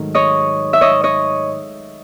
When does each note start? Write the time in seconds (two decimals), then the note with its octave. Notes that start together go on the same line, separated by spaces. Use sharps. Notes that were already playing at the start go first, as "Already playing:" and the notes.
Already playing: G#2 D#3 F#3 A3
0.15 C#5 D#5
0.73 E5
0.81 C#5 D#5
1.04 C#5 D#5